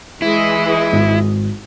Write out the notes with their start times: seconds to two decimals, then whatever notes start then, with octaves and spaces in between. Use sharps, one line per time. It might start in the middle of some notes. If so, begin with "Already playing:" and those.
0.22 E3 G#3 E4 D#5
0.92 G#1